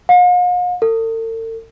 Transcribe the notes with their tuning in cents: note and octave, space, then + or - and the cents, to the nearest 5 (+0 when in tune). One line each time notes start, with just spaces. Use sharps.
F5 +45
A4 +45